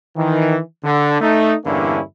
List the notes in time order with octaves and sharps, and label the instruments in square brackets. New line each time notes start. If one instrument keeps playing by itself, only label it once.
[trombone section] D#3 E3
D3
A3 D#4
E2 G2 D3 A#3 C#4 E4